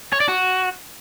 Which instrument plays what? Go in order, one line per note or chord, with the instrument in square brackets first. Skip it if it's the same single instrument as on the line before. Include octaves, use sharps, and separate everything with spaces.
[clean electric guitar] C#5
D5
F#4